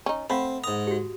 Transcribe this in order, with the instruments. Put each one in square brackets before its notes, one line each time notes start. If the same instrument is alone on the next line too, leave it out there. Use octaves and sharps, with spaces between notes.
[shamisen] C#4 D#4
[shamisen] A3 [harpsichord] C4 [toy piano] F5 F#5 B5
[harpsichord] G#2 A#5 [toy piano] D#6
[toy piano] F#4 G4